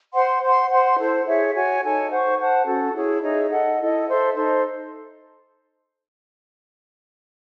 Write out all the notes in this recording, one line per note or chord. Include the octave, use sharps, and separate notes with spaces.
C5 F#5 C6
C5 F#5 C6
C5 F#5 C6
E4 A4 C5
E4 G#4 C#5 E5
F#4 C#5 G#5
D#4 A4 C#5 G#5
C5 F#5 C#6
C5 F#5 A5
C#4 F#4 A4
E4 G#4 C#5
D#4 G#4 C#5 E5
A4 D#5 F#5
E4 A4 D#5
A4 C5 E5
D#4 A4 C5